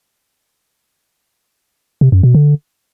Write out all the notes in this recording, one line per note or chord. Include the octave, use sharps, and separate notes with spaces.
C3
F#2
B2
D3